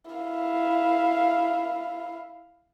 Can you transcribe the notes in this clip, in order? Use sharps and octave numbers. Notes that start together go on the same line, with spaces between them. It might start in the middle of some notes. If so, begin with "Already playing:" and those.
E4 F5